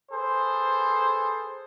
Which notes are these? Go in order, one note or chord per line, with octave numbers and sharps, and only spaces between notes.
G#4 A4 B4 C5